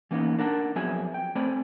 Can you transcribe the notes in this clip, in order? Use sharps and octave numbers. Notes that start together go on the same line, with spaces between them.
E3 A#3 B3 C#4 D#4
D4 A#4 F#5 A5
F2 F#3 B3 G#4 E5 G#5
G5
A3 C4 D5 G#5 B5